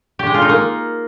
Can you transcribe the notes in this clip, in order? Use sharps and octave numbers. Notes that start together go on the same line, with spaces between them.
G4
G#3
F4
D#4
A#3